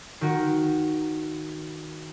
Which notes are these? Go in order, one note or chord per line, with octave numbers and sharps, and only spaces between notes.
D#3 F#4